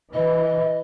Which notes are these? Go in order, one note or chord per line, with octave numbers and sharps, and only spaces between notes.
E3 D#5